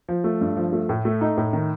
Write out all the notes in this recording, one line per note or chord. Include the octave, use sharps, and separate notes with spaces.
F3
A3
G2
F3
A3
A2
A3
D#4
A2
D#3